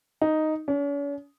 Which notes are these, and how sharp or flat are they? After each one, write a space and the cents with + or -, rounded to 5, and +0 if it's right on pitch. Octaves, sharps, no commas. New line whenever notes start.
D#4 +0
C#4 +45